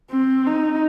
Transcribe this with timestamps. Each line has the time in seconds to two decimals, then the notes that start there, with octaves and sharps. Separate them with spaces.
0.10 C4
0.46 D#4